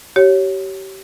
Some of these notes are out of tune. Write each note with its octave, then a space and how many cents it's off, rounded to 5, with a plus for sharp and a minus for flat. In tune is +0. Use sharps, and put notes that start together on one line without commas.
G4 -30 C#5 +0